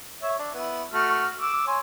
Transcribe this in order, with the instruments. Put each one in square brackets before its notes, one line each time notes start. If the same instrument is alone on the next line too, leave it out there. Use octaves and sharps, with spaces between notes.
[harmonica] C#5 E5
D4
B3 E4
A3 F#4 F6
D6 E6
C#5 G#5 C6